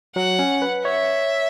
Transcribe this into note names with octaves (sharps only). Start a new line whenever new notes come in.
F#3 F#5
C#4
B4
C#5 E5